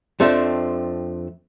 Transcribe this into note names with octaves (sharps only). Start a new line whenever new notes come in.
F2 F3 A3 C4 D4